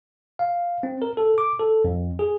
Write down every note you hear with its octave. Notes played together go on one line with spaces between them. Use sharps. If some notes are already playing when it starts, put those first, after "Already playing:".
F5
C4
A#4
A4
D6
A4
F2
G#4